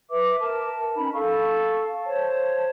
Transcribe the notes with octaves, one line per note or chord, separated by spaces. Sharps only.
B4 E5 D6
A#4 A5
C#4 D#4 B5
A4 F5 C#6
C5 C#5 A5